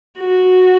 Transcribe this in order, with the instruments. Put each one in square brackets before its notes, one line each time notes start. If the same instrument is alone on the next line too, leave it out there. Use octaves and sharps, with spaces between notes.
[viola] F#4